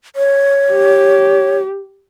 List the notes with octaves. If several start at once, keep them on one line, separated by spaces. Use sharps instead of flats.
C#5
G4